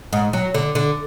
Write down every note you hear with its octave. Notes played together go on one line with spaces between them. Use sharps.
G#2
F#3
D3
D3